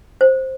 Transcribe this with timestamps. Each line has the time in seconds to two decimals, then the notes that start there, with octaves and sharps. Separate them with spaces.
0.21 C5